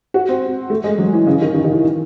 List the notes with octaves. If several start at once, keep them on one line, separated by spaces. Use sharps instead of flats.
F#4
C4
A3
G#3
F#3
E3
C#3
D#3
D#3
D#3
E3